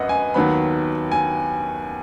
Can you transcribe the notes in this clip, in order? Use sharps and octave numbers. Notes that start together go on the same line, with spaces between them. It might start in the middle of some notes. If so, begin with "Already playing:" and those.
Already playing: G#1 F#2 B4 D#5 F#5
G#5
D#2 D#3 F#3 B3 B5
G#5